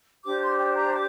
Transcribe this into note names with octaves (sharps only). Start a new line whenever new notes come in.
D4 G4 C5 D6
C6
G5
A#5
D6